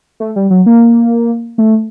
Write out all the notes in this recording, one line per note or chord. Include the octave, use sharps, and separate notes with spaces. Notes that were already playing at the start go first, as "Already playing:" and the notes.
A3
G3
F#3
A#3
A3